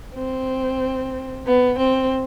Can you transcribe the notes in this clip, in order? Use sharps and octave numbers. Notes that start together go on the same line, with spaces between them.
C4
B3
C4